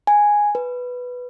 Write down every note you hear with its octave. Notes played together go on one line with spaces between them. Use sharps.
G#5
B4